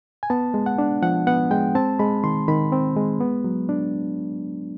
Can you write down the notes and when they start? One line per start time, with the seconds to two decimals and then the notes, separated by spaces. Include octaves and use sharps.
0.23 G#5
0.30 B3 A5
0.54 G#3
0.66 F#5
0.78 D4
1.02 F3 F#5
1.27 B3 F#5
1.51 G#3 G5
1.75 C4 A5
1.99 G#3 B5
2.24 D#3 C6
2.48 D#3 B5
2.72 C4
2.96 G#3
3.21 B3
3.44 F#3
3.69 D4